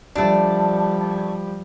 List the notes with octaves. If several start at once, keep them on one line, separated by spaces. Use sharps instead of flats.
F3 G3 A3 D4